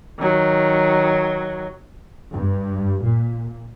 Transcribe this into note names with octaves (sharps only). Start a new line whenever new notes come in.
D#3 F#3
G2
A#2